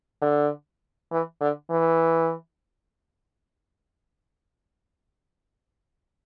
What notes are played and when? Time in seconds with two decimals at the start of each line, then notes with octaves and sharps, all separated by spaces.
0.22 D3
1.12 E3
1.41 D3
1.70 E3